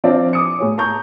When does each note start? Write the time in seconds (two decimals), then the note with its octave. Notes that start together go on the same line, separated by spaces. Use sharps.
0.04 F3 C4 D4 D5 E5
0.33 D6 D#6 C#7
0.59 A2 G#4 C#5
0.78 A5 A#5 C#6 G6